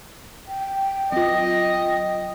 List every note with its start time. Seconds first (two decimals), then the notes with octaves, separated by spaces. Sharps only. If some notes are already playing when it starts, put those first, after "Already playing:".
0.48 G5
1.12 F#3 F4 D#5